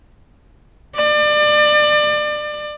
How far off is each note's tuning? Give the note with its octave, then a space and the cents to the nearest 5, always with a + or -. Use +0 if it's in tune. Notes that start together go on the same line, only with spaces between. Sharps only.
D5 +30